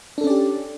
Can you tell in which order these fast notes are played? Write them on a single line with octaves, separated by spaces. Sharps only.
D4 A4 C#4 D5 G4